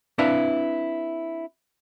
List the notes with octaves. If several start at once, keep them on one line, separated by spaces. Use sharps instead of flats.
C4 D4 E4 B4 E5 F5